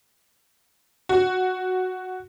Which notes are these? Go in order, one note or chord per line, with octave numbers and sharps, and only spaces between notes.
F#4